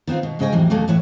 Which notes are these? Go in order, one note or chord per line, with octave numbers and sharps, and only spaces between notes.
D#3 B3 C4 F4
B2 D#3
G#2 C#3 C#4 D#5 G5 G#5
F2 A2 E3 F#3 G3
D#2 A#2 F#3 A3 A#3 C#4
A2 E3 E4 B4 C#5